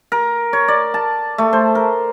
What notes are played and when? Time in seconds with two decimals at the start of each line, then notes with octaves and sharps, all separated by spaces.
0.12 A#4
0.53 C#5
0.68 D5
0.94 A5
1.38 A3
1.53 C5
1.75 A#4